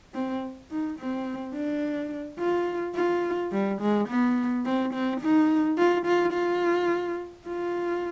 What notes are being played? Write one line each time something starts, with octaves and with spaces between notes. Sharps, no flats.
C4
D#4
C4
D4
F4
F4
G3
G#3
B3
C4
C4
D#4
F4
F4
F4
F4